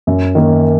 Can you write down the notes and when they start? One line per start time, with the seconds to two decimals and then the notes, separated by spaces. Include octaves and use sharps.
0.07 F#2
0.35 D#3 A#3